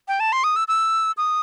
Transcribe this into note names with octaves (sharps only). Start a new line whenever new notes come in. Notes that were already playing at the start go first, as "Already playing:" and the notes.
G5
A5
C6
D#6
E6
E6
D#6